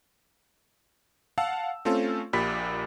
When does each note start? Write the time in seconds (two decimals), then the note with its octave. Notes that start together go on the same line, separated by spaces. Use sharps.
1.38 F5 F#5 A5 E6
1.85 A3 C4 C#4 F4 A4
2.33 A#1 A#2 G4 B5 B6